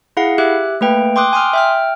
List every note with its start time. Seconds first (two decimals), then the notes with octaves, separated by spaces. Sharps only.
0.17 E4 G#4 F5 F#5
0.38 G4 E5 F#6
0.81 A3 A#3 B4 G5
1.16 G5 C6 D6 D#6 F#6
1.33 G#5 C6 D#6 F6
1.53 E5 G5 F6